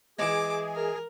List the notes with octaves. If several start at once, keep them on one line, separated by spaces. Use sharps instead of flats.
E3 G#3 G#4 D6
A#4